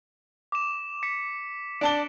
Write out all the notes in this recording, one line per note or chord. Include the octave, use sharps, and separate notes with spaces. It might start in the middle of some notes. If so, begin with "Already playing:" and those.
D6 E7
D6 B6 C#7
D4 A5 D7 G7